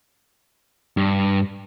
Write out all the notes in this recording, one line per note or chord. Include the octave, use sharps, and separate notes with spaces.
G2